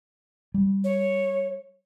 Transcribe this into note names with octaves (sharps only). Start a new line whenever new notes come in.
G3
C#5